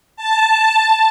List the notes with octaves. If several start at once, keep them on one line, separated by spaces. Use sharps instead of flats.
A5